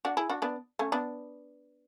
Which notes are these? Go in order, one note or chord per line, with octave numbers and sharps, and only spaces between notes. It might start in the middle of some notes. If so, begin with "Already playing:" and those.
D4 F#4
E4 G#4
D4 F#4
B3 D4
A3 C#4
B3 D4